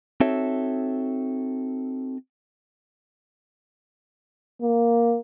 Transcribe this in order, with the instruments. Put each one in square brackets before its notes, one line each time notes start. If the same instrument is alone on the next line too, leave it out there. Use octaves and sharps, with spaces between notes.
[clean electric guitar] C4 D#4 F#4 A4 C#5 E5
[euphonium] A#3